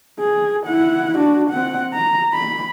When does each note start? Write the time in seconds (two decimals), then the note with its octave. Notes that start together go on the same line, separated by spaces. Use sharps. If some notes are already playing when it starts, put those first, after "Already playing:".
0.19 G#4
0.66 E4 F#5
1.18 D4 F#4
1.50 C4 F#5
1.94 A#5
2.34 B5